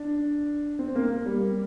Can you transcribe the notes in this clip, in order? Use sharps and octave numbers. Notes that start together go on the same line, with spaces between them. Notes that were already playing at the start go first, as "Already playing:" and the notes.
Already playing: D4
C4
A#3
A#3
G3